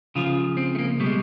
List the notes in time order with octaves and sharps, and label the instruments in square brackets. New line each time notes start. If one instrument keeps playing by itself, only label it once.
[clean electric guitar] C#3 F3 F4
C4
A3
A#3
B2 G3 A3
G#3